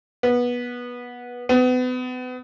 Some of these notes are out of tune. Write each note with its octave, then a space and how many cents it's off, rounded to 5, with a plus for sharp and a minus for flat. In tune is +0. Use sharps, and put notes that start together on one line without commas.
B3 -15
B3 +35